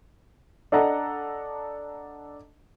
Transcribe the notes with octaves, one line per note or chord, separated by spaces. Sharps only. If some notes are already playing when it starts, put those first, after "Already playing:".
D4 A4 D#5 F#5 A#5